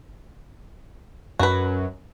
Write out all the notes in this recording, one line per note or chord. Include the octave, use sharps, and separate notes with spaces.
F#2 F#4 B4